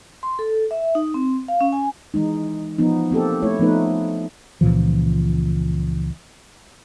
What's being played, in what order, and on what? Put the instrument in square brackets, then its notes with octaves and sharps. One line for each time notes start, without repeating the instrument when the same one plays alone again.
[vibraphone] C6
A4
E5
D#4
C4
F5
C#4
G#5
[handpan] E3 G#3 D#4
F3 B3 D#4
A#3 C4 G4 A4
A3 E4 C#5
F3 A3 B3 D#4 B4
[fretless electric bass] C#2 A#2 E3 F3